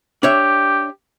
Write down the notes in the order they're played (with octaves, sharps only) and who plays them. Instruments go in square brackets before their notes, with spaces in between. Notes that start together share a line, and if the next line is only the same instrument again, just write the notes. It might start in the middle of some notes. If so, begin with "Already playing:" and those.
[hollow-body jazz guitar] D4 C#5 E5 [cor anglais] G4